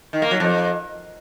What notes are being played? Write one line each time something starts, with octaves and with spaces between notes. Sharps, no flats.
D#3
A#3
F#3
F2